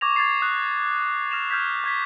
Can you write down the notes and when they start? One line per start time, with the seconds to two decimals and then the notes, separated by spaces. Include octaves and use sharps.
0.01 C#6 D6 G#6 A#6 F7
0.16 G#6 A6 C7
0.42 D#6 F#6
1.31 F6 A#6 E7 F7
1.50 F6 G6 G#6 B6
1.84 C#6 G#6 B6